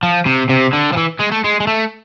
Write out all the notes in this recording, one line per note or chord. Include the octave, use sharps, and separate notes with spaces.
F3
C3
C3
D3
F3
E3
G#3
A3
G#3
G#3
A3